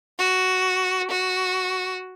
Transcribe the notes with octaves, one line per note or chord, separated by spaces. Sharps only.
F#4
F#4